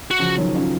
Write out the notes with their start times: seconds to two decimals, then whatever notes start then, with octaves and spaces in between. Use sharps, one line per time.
0.11 F#4
0.19 C#3 F3
0.37 D#3 F#3
0.55 C#4 F4